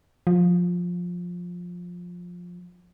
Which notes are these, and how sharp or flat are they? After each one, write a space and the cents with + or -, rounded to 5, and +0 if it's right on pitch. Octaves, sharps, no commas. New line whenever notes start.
F3 +15